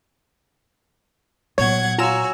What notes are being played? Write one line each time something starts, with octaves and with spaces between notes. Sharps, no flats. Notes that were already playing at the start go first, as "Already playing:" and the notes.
A#2 F#3 B3 C#5 F#5 G#6
F4 F#4 C#5 G#5 A#5 E6 E7